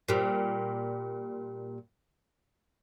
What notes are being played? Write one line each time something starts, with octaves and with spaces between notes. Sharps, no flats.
A#2 G3